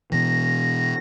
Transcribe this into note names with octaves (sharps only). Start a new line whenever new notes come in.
B2 E3 A#6